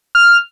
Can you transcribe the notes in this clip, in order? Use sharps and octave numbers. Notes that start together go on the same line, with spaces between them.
F6